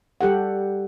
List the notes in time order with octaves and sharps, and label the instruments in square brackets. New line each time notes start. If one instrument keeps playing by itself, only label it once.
[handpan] G3 G4 A4 F#5